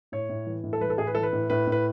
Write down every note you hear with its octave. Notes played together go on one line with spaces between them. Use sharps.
A2 C#5
A2
E3
A2
A4
E3 B4
A4
A2 G#4
B4
E3 A4
B4
A2
A2 B4
A2
B4